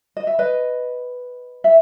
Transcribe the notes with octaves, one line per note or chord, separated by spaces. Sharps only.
D#5
E5
B4 D#5
E5